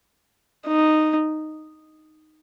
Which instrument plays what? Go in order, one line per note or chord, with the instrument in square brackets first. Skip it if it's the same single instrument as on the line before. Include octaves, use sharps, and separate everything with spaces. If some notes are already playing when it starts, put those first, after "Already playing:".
[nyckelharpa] D#4